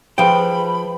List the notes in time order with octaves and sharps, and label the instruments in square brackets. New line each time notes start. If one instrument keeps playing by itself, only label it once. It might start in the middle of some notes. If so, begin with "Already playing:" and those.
[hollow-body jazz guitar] F3 G5 [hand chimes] G#4 B4 C5 [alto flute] B5